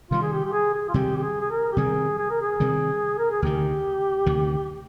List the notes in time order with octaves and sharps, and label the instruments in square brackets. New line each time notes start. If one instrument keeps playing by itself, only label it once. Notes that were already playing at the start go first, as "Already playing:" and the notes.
[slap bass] C3 D#3 G3 [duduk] F4
[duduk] G#4
G4
G4
G#4
G#4
F4
[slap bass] C3 D#3 G3 [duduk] G4
[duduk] G4
G#4
G#4
A#4
G4
[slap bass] C3 D#3 G3 [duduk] G#4
[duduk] G#4
A#4
G#4
[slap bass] C3 D#3 G3
[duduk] A#4
G#4
[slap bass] D2 C3 D#3 [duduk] G4
[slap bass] D2 C3 D#3